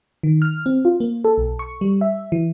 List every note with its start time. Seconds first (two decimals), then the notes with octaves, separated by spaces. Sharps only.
0.23 D#3
0.42 F6
0.66 C4
0.85 F4
1.00 A#3
1.24 A4
1.38 B1
1.59 C#6
1.81 G3
2.01 E5
2.32 E3